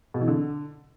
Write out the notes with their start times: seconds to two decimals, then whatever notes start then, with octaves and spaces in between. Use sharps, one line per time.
0.14 B2
0.21 E3
0.28 D3